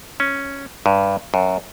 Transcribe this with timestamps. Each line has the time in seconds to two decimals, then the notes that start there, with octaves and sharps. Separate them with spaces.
0.20 C#4
0.86 G2
1.34 F#2